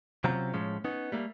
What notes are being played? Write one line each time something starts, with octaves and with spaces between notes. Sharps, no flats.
C3 F#3 C4 C#4 F4 A#5
A2 F3 G#3 C#4
B3 C#4 D#4
G3 A3 A#3